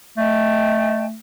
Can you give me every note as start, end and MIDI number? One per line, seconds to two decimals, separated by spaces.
0.17 1.17 57
0.17 1.05 75
0.17 1.05 79
0.17 1.05 81